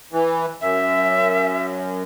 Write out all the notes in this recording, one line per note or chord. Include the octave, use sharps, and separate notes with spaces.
E3
F#2 E5